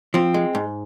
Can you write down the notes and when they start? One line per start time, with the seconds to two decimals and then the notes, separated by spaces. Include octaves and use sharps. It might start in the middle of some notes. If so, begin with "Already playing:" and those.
0.14 F3 C4
0.34 G#3
0.55 G#2